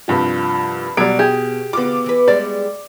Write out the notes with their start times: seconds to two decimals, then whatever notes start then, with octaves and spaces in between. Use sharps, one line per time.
0.08 C2 G2 F3
0.97 B2 F#3 G3 D7
1.19 G4 G#4
1.73 D3 B3 F4 D6
2.06 E3 B4
2.28 G3 G#3 D5